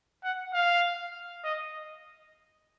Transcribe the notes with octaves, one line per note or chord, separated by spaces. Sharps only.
F#5
F5
D#5